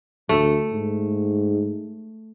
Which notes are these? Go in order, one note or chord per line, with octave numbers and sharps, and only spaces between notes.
D2 A3
G#2